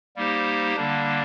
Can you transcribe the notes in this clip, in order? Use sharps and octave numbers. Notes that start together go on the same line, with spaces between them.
G3 A#3 D#4 G4 C5
D3 G3 A#3 D4